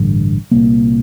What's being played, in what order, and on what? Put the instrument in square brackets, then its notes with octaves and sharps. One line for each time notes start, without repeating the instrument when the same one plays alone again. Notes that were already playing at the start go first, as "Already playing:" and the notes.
Already playing: [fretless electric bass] A1 G2 D3
C2 A#2 A#3